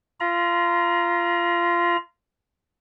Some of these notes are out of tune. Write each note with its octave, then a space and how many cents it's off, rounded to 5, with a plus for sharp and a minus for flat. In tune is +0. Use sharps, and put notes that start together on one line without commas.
F4 -20 A#5 +25